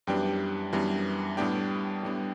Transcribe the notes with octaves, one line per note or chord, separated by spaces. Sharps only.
F#2 E3 G3 B3 D4 G4 G5
F#2 E3 G3 B3 D4
A2 G3 B3 D4 G4 G5
A2 G3 B3 D4